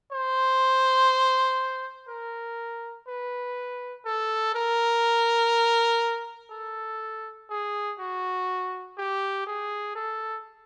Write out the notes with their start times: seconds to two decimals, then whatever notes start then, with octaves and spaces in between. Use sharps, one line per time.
0.12 C5
2.08 A#4
3.08 B4
4.05 A4
4.55 A#4
6.51 A4
7.50 G#4
7.99 F#4
8.98 G4
9.47 G#4
9.95 A4